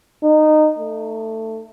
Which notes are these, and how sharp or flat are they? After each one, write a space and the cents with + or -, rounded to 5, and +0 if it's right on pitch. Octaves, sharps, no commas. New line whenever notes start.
D#4 -20
A3 +15